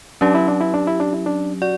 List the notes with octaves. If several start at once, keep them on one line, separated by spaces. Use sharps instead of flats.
F#3 C#4 D4 G4
E4
D4
E4
D4
E4
D4
E4
D4
F#4 D5